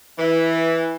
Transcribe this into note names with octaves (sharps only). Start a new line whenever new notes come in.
E3